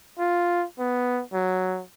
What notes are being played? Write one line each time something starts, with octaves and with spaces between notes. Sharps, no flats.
F4
B3
F#3